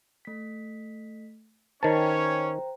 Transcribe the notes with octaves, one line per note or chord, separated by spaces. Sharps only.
A3 B6
D#3 C#4 C5 C#5 G5 A5 A#5